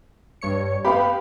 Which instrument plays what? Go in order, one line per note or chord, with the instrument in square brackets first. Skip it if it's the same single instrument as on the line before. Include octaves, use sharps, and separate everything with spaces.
[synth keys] G2 C#5 C#7
[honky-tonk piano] B3 F5 B5 [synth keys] G4